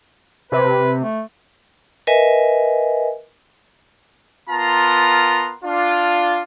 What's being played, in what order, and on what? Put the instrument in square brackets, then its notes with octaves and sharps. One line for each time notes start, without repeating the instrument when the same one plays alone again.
[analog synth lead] C3 [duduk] B4
[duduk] A3
[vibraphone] A#4 B4 D#5 E5 G#5
[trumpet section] B3 F4 A#4 A5 A#5 C6
D4 F4